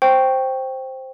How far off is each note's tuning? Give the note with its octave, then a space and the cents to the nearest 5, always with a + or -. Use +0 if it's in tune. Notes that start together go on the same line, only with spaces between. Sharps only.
C5 +5 G5 +0 C#6 +0